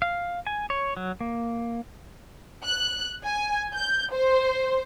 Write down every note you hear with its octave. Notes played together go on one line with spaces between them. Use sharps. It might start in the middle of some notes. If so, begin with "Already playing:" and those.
F5
G#5
C#5
F#3
A#3
F#6
G#5
G6
C5